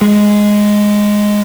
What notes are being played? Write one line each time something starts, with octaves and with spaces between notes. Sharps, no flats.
G#3